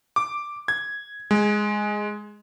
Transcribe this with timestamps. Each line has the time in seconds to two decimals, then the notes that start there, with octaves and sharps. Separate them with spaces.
0.16 D6
0.68 G#6
1.31 G#3